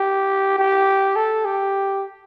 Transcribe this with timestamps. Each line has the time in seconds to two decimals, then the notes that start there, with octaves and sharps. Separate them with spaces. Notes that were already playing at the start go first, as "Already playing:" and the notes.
Already playing: G4
0.58 G4
1.16 A4
1.45 G4